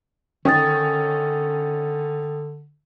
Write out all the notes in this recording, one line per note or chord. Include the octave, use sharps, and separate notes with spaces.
D3 D#3 C#4 G5 D#6 A6